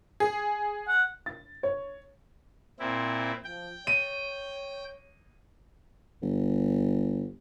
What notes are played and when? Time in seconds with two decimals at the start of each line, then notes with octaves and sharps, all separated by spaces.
0.20 G#4
0.88 F#5
1.26 A6
1.63 C#5
2.80 A#2 C4 E4
3.44 F3 G5
3.87 C#5 D#7
6.22 G1